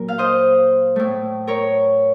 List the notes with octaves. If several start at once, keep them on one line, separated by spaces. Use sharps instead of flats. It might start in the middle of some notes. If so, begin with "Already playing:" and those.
Already playing: A#2 F#3 A#4
F5
C5 D#5
A2 A3
A#4 C#5